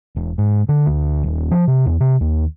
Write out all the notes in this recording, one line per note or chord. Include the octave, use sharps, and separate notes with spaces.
E1
G#2
D3
D2
D#1
F3
C3
E2
C3
D#2